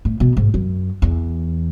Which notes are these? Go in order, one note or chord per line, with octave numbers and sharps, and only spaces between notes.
A2
B2
G#2
F#2
E2